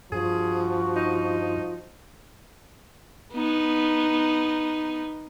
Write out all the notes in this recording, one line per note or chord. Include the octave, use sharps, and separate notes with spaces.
G2 F3 F#4 G#4
D#4
B3 D#4